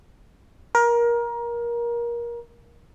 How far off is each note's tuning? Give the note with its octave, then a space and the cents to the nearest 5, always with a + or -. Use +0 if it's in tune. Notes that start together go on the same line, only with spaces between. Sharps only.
A#4 +20